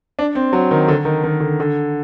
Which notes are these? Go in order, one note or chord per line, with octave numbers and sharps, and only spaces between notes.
D4
C4
F#3
D#3
D3
D#3
D#3
D3
D3